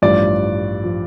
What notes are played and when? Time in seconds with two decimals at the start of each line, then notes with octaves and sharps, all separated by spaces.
0.02 A1 G2 F3 D5
0.84 F3